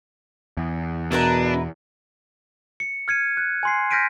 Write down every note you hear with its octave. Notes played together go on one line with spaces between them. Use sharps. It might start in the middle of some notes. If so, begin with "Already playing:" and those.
E2
B2 D4 E4 A#4 B4
C#7
F6 G#6 C#7 D#7
F#6
G#5 C6 C7
F6 G6 A#6 B6 D7 D#7